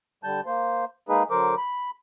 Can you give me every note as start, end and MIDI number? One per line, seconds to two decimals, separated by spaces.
0.24 0.40 50
0.24 0.40 55
0.24 0.40 81
0.24 0.40 91
0.46 0.85 58
0.46 0.85 72
1.09 1.23 56
1.09 1.23 58
1.09 1.23 63
1.09 1.23 68
1.09 1.23 71
1.30 1.55 50
1.30 1.55 54
1.30 1.55 70
1.30 1.55 72
1.30 1.55 86
1.58 1.90 83